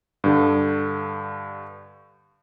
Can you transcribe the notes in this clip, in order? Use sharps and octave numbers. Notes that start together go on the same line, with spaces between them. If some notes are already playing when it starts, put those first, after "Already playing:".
G2 D3